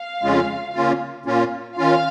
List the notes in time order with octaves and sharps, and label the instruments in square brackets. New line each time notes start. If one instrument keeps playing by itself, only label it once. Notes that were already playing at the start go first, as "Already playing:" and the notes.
Already playing: [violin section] F5
[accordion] F2 C#3 G#3 C#4 F4
C#3 A#3 C#4 F4
A#2 A#3 C#4 F4
[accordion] D#3 C#4 F4 [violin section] F5